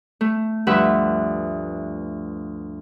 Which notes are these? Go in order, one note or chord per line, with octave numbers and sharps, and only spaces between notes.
A3
D2 G2 F3 B4 E5 F#5